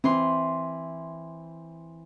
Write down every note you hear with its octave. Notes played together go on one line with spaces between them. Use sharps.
E3 C4 C6